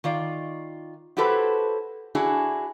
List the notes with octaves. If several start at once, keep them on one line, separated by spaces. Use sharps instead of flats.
D#3 F4 D5
E4 F#4 G4 A4 B4 C5
D4 E4 F#4 G#4